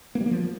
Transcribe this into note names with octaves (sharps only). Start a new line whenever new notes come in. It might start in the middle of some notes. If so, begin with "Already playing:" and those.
A#3
G3
A#3
F3